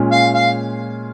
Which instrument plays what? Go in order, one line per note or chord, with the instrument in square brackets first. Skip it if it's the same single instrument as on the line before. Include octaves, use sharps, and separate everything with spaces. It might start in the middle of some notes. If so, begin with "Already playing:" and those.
Already playing: [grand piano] A#2 G#3 C#4 F4
[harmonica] F5
F5